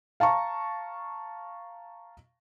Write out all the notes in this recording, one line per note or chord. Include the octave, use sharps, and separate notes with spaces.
F5 A5 A#5 C#6